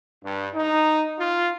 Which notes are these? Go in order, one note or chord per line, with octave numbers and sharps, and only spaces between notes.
G2
D#4
F4